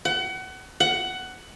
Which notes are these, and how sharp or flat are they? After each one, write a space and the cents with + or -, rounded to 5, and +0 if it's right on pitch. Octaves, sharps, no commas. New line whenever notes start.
F#5 +30
F#5 +15